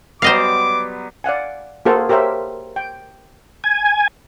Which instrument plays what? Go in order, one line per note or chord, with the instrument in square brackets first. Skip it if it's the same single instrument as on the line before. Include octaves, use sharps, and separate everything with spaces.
[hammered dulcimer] F#3 G3 B3 [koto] C5 D#5 F5 [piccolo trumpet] D6
[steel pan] D5 F5 F#5 G#5
A#3 F#4 G#4 A4 C5 F5
G4 A#4 C5 C#5 E5
G5
[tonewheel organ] G#5